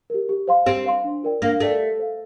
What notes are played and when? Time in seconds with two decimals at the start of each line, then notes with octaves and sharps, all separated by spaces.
0.10 G4 A#4
0.29 G4
0.48 C5 F5 C6
0.66 C4 G4
0.85 C5 F5 C6
1.04 D4
1.23 F4 A#4 D5 G5
1.42 A#3 D4
1.60 A3 F4 A#4 D5 G5
1.79 G4
1.99 C5 F5